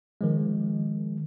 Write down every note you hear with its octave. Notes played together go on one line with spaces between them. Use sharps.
D#3 F3 G#3